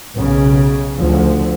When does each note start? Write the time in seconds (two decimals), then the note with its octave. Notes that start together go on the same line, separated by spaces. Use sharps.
0.17 B1 C#3
0.97 D2 F3